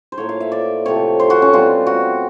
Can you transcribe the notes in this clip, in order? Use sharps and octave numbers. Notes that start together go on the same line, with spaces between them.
C5
A2 F3 A#3 C#5
F5
E5
D5
C3 F3 A3 C4 C#5
C5
F#4
C#4
B2 G3 C4 F4
F#4